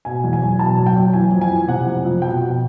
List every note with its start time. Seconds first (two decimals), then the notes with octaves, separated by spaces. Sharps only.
0.05 B2 G#5
0.24 E2
0.33 G#5
0.42 F#3
0.59 B2 A5
0.77 F#3
0.86 G5
0.96 F#3
1.13 E3 G#5
1.32 F2
1.41 G#5
1.50 E3
1.68 C3 F#5
1.87 F2
2.05 F2
2.22 B2 G5
2.41 B2